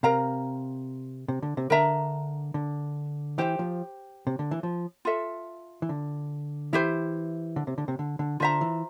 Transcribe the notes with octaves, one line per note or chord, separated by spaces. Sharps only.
C3 A#4 F5 A#5
C3
D3
C3
D3 A#4 E5 A#5
D3
E3 G4 C5 G5
F3
C3
D3
E3
F3
F4 A4 E5
E3
D3
E3 E4 G4 C5
D3
C3
D3
C3
D3
D3
D3 F4 C5 E5 A#5
E3